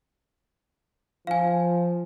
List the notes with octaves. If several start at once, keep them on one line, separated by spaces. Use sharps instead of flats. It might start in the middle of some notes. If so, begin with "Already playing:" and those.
F3 F5 G#5